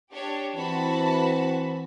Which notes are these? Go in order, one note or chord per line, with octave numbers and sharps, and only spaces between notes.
D4 G4 C#5
E3 C4 F#4 A5 B5